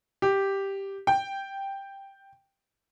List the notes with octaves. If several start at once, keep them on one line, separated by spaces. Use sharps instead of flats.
G4
G5